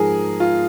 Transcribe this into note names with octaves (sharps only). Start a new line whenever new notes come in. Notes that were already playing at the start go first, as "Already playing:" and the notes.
Already playing: G#2 F3 G#4 A#4
F4